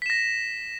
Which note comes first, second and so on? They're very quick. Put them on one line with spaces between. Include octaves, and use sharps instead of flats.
B6 E7 A#6